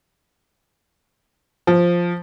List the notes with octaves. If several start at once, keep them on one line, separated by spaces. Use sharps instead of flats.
F3